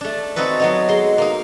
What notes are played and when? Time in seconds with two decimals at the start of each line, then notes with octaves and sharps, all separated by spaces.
0.01 A3 D4
0.36 C4 D#4 F#4 A4 B4
0.60 F#3 B3 D#4
0.89 G#3 C6
1.18 A#3 D#4